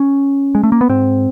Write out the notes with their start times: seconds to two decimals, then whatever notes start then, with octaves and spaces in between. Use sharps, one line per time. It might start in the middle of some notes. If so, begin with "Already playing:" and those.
Already playing: C#4
0.55 G#3
0.63 A3
0.72 A#3
0.81 B3
0.89 G#2 C4